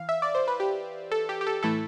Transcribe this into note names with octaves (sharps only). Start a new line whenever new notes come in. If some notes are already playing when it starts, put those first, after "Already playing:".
Already playing: E3 F5
E5
D5
C5
B4
G4
A4
G4
G4
A4
A2 E3 A3 E4 A4